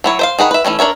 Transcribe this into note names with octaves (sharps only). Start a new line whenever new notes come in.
F#3 E4 C#5
C5 E5 F5
D#3 G#4 F#5 B5
B4 E5
E3 G3 A3 C#4
D4 A#4 C#5 E5